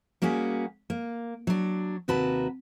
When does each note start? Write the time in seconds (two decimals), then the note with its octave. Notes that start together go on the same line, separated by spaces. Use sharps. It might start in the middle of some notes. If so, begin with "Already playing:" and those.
0.22 G3 A#3 C#4 F#4 G#4
0.90 A#3
1.47 F#3 D4
2.08 D#2 C3 F#4 A#4 B4 A5